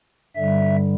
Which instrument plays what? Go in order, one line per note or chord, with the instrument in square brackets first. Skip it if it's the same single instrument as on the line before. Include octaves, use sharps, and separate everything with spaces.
[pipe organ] G2 D3 G3 E5